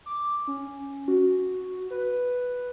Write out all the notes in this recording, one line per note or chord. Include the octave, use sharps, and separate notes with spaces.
D6
C#4
F#4
B4